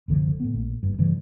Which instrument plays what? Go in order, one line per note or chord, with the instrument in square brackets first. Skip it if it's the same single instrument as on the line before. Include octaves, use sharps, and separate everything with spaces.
[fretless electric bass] F#1 C2 D3 F3
A2 B3
A#1
F#1 G2
G2 C#3 E3 G3